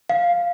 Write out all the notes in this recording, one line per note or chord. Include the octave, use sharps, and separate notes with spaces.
F5